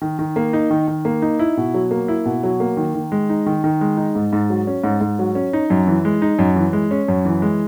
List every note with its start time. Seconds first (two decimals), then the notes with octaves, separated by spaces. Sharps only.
0.02 D#3
0.19 D#3
0.36 A#3
0.53 D#4
0.70 D#3
0.88 D#3
1.05 A#3
1.22 D#4
1.39 E4
1.57 B2
1.74 F#3
1.91 A#3
2.08 E4
2.25 B2
2.43 F#3
2.60 A#3
2.77 D#3
2.94 D#3
3.12 G#3
3.29 D#4
3.46 D#3
3.64 D#3
3.81 G#3
3.97 D#4
4.15 G#2
4.33 G#2
4.50 F#3
4.67 C#4
4.84 G#2
5.01 G#2
5.19 F#3
5.35 C#4
5.53 D#4
5.70 F#2
5.87 E3
6.05 G#3
6.22 D#4
6.39 F#2
6.56 E3
6.73 G#3
6.91 C#4
7.08 F#2
7.25 E3
7.42 G#3